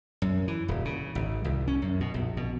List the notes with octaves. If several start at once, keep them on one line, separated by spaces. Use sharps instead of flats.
F#2
E3
D#1
C#3
G#1
C2
C#4
F#2
B2
A#1
B2